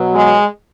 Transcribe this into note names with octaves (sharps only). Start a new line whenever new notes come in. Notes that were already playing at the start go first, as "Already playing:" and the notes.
Already playing: B2 F#3
G#3